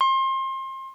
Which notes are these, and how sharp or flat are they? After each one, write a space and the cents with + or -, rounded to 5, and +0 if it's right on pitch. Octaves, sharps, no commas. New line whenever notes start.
C6 +30